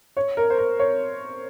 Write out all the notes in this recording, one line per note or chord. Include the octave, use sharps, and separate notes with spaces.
C#5
A#4
C5
A#4
C#5